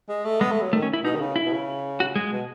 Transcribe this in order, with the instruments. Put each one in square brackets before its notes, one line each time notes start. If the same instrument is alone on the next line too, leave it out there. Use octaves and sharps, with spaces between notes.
[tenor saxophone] G#3
A3
[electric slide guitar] G#3 [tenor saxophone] B3
[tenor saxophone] A3
F#3
[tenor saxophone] D#3 [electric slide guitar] A3
[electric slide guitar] C#4
E4
[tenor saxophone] B2 [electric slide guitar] D#4
[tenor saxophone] D#3
C#3
[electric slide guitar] E4
[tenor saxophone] B2
C#3
[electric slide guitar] F#4
G#3
[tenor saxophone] B2